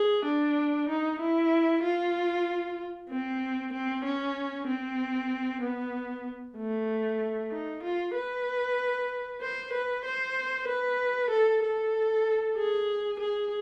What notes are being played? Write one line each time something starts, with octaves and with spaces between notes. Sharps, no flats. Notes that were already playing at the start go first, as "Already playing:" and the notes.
Already playing: G#4
D4
D#4
E4
F4
C4
C4
C#4
C4
B3
A3
D#4
F4
B4
C5
B4
C5
B4
A4
A4
G#4
G#4